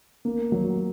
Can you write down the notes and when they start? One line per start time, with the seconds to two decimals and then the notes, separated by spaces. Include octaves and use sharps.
0.25 A#3
0.52 F#3